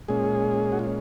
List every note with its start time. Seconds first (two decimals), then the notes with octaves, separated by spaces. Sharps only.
0.08 A#2 G#3 C#4 G#4
0.72 F#4
0.79 F4